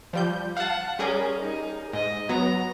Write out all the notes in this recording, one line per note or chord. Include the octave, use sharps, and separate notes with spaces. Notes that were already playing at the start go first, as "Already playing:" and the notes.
F3 G3 G6
F5 F#5 A5
G3 C#4 G#4 A#4
D#4
G#2 D#5
F#3 B3 A#5